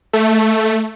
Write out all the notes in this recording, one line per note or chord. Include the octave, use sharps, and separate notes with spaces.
A3